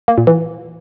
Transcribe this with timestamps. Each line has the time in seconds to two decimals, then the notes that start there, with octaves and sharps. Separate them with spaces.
0.08 A#3
0.18 A#2
0.27 E3